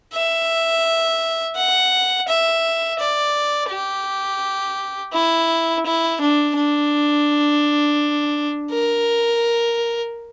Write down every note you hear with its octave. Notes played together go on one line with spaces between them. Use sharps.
E5
F#5
E5
D5
G4
E4
E4
D4
D4
A#4